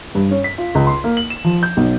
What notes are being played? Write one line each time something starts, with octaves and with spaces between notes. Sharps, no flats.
G2
C#4
B6
F4
C#2
C6
A#3
F#7
E7
F3
G6
B1